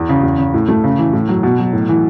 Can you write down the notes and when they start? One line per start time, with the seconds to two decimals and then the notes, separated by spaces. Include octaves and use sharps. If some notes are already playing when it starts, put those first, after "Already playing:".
Already playing: E2
0.09 C#3
0.23 E2
0.39 C#3
0.54 A2
0.68 A3
0.84 C#3
0.99 E3
1.13 A2
1.28 F#3
1.43 B2
1.59 F#3
1.73 A2
1.89 E3